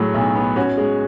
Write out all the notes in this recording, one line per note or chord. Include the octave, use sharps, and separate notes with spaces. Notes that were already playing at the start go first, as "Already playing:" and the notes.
Already playing: A2 F#3 G#4
B1
B3
C#4 F#4
G#3